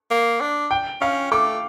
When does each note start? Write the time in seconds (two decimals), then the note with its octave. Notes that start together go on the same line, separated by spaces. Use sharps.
0.10 A#3
0.41 D4
0.71 G5
1.01 C#4 F5
1.32 A3 D6